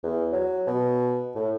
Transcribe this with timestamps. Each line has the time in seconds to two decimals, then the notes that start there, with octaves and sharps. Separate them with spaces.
0.03 E2
0.32 F#3
0.67 B2
1.35 A2